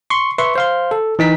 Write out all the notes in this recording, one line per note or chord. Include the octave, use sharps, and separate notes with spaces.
C6 C#6
B4 E5 C6 C#6
C5 F5 C6
A4
E3 D#4 B6